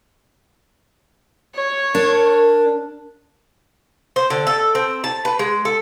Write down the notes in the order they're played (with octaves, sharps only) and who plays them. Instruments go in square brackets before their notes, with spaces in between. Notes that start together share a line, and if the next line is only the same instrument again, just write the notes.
[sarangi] C#5
[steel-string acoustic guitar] D4 [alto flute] A#4
[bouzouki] C5
D3
A4
C4
A5
B4
G#3
A4